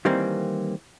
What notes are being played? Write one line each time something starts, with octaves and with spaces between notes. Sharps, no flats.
D#3 E3 G3 A#3 C4